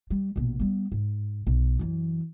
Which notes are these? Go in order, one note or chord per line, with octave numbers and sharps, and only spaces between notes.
G3
A#1 B2
G3 B3
G#2
B1
F#2 E3